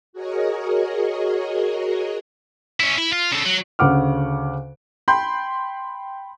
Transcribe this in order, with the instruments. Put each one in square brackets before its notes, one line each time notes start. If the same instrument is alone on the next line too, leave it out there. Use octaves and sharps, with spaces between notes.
[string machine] F#4 G#4 A#4 C#5 D#5
[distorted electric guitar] C#4 E4
E4
F4
C#3 A4
F#3
[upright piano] D2 C#3 F#5 D6 F6
G5 B5 C6 G6